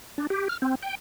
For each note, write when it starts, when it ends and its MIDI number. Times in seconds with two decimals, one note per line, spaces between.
0.18 0.27 62
0.30 0.48 67
0.49 0.57 89
0.62 0.75 60
0.83 0.95 79